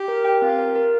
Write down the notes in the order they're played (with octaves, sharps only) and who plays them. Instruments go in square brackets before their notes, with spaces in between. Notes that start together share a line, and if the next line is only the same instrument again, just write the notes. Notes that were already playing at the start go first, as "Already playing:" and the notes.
Already playing: [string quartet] G4
[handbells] A#4
G5
[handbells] C4 [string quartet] F4
[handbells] A#4
A#4